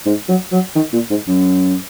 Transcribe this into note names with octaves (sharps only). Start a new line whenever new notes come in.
G#2
F#3
F#3
D#3
A#2
G#2
F#2